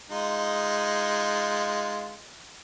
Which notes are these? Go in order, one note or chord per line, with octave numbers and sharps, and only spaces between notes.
G#3 D#4 F4